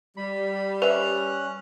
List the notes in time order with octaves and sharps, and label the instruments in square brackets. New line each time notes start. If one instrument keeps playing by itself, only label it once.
[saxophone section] G3 [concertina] B5
[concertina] C#4 F#6 [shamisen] B4 C5 E5 [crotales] F7